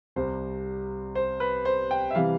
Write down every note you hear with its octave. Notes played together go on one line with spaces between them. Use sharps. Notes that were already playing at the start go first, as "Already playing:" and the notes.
C2 C3 G3 C5
C5
B4
C5
G5
E5
C3 E3 G3 F5